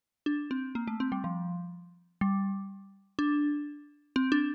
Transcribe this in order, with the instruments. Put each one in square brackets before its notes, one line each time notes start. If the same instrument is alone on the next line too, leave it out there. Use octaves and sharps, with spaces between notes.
[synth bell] D4
C4
A#3
A3
C4
G3
F3
G3
D4
C4
D4